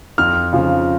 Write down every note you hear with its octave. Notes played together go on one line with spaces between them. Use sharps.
F2 F6
C#3 F3